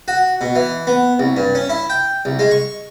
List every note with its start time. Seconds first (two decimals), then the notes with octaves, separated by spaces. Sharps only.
0.08 F#4
0.41 B2
0.55 E3
0.87 B3
1.19 C2
1.36 G2
1.55 C#4
1.69 E4
1.90 G5
2.25 C2
2.39 G#3
2.51 C#6